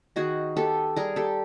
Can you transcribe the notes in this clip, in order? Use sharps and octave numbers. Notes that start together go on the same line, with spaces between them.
D#3 F#4 G#4
B3 G4 A4
G3 G#4 A#4
G4 A4